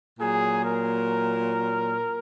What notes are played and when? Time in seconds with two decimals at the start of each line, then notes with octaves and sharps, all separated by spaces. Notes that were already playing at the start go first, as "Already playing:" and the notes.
0.19 A#2 F#3 G#4
0.65 A#4